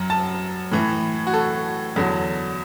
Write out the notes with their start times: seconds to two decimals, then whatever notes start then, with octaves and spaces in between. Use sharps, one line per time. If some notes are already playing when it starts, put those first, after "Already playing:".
Already playing: F#2 F#3
0.10 A5
0.71 A2 E3
1.27 F#4
1.34 A4
1.96 E2 D3 F#3